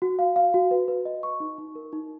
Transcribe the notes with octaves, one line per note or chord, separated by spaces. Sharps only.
F#4
F5
F5
F#4
B4
B4
D#5
C#6
D#4
D#4
A#4
D#4